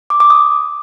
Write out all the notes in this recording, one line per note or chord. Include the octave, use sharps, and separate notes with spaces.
D6
D6
D#6